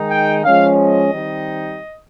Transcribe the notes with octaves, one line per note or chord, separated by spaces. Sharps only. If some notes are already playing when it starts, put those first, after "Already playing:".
Already playing: D#3 G#3 D#4
G5
F3 G#3 C#4 F5
D#5
D#3 G3 C4 D#4